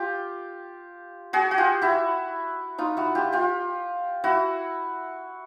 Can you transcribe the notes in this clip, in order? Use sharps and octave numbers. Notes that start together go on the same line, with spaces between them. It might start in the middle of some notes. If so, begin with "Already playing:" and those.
Already playing: F4 G4
F#4 G#4
F#4
F4 G4
E4 F#4
D#4 F4
E4 F#4
F4 G4
F4 G4
E4 F#4